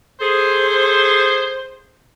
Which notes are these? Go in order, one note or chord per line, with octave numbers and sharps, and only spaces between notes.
G#4 A4 C5